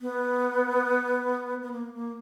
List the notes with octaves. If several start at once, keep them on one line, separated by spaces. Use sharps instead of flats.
B3
B3
A#3
A#3